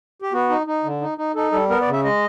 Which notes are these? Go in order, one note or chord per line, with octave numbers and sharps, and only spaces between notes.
G4
B3 F#4
D#4
D#4
D3
D#4
D#4
D#4 A4
G3 A4
B3 A#4
D5
C#3
E5
G#3 D#5